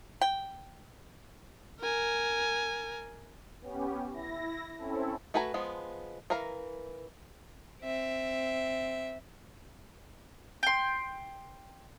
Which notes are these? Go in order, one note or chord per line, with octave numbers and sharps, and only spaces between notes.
G5
A#4 G#5
B3 C#4 G4
E4 A#6
C4 C#4 E4 A4
A3 F#4 B4 G#5 A#5
F3 G#3 B3
E3 A#4 F5 A#5
C4 E5
G5 C6